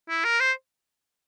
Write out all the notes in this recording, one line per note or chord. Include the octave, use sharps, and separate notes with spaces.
E4
A#4
C5